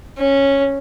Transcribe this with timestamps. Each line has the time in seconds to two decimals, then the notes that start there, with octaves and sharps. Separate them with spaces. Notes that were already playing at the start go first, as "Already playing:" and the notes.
0.18 C#4